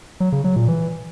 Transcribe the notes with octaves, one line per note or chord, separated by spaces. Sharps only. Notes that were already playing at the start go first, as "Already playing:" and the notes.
F#3
C#3
F#3
A#2
E3